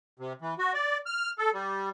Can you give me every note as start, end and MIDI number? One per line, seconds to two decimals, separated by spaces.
0.19 0.33 48
0.42 0.54 52
0.59 0.72 66
0.74 0.97 74
1.06 1.30 89
1.38 1.50 69
1.54 1.89 55